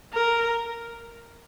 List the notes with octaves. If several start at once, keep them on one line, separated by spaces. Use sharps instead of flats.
A#4